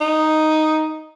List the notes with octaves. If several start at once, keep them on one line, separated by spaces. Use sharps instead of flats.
D#4